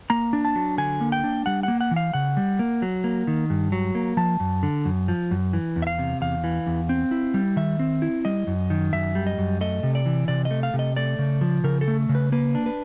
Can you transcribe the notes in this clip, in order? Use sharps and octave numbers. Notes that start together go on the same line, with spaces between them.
A#3 A#5
D4
A5
F#3
D3 G#5
A#3
G5
D4
G3 F#5
A#3 F#5
F#5
E3
F5
C#3 F#5
G3
A#3
F#3
A#3
D#3
G2
F#3
A#3
F3 A5
F#2
D3
F#2
F3
F#2
E3
E2
E5
F5
C3
E2 F5
E3
E2
C4
E4
G3
D#3 E5
C4
E4
G3 D#5
F#2
D#3
F#2 E5
G3
D#5
F#2
A3 D#5
C3
D5
E3
C3 D5
D#5
A3
F5
C3
D#5
A3 D5
C#3
F3
C#3 A#4
A4
A3
C#3
B4
A#3 B4
D4
B4